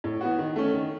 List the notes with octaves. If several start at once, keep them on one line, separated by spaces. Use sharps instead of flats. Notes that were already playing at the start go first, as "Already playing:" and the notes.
A2
E3 B3 F#4
D#3
A3 C#4
D#3